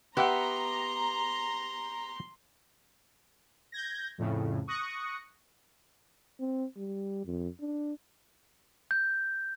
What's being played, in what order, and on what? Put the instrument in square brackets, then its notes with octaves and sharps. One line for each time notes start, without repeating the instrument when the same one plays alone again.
[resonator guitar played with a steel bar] B3 G4 [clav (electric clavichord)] B4 E5 F#5 [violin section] A#5 [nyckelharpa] C6
[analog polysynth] G6 G#6 A#6
F2 A2 C#3
C#6 D#6 F#6 A#6 C#7
[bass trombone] C4
G3
F2
D4
[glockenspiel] G6